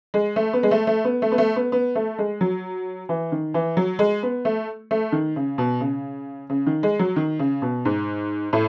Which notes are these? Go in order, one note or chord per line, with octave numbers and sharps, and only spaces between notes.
G#3
A3
B3
G#3
A3
A3
B3
A3
B3
A3
B3
B3
A3
G#3
F#3
E3
D#3
E3
F#3
G#3
B3
A3
A3
D#3
C#3
B2
C#3
C#3
D#3
G#3
F#3
D#3
C#3
B2
G#2
A2